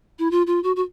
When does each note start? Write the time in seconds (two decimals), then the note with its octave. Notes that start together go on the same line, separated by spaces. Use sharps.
0.19 E4
0.31 F4
0.47 F4
0.64 F#4
0.76 F#4